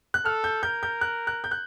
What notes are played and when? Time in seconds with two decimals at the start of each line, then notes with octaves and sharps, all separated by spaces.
0.14 F#6
0.25 A4 F6
0.44 G6
0.63 A#4 G6
0.83 G6
1.01 F#6
1.27 F#6
1.44 G6
1.51 F#6